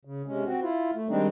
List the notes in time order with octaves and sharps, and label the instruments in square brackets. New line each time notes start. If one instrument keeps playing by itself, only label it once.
[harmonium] C#3
C3 G#3 C#4
C4 F#4
E4 F4
A3
D#3 G3 G#3 C4 D4 D#4